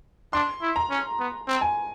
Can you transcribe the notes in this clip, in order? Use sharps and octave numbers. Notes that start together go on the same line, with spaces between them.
D4 C6
E4
A#5
C#4
B3
C4
G#5